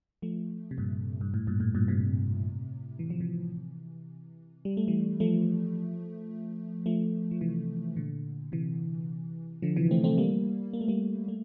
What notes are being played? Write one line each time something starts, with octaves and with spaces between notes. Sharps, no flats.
F3 A3
C3
G2 A#2
G2
A2
G2 A#2
A2
G2 A#2
A2 C3
E3
F3
C3 E3
G3
A3
E3 G3
F3 A3
F3 A3
F3
C3 E3
A#2 D3
C3 E3
D3 F3
C3 E3
A3 C4
A3 C4
G3 A#3
A#3
A3
G3 A#3
A3